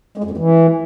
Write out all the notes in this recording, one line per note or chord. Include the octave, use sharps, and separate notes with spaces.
G#3
F2
F#2
E3